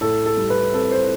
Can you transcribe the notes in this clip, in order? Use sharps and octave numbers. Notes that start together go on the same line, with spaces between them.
A2 A4
A4
G3
B4
C4 A4
C5